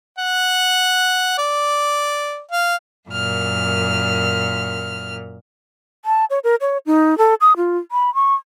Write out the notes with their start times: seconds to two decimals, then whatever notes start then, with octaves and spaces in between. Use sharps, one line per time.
0.18 F#5
1.38 D5
2.51 F5
3.09 F#2 A#2 F6
6.05 A5
6.30 C#5
6.44 A#4
6.61 C#5
6.86 D#4
7.18 A4
7.41 D#6
7.57 F4
7.92 B5
8.15 C#6